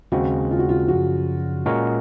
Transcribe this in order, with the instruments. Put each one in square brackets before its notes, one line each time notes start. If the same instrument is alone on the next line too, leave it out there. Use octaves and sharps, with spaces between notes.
[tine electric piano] D#2 C#3 G#3 C4 [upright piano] F#4
[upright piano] F4
F#4
F4
[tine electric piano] F#2 C#3 F3 [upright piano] F#4
[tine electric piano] A#2 G#3 C#4 F#4 A#4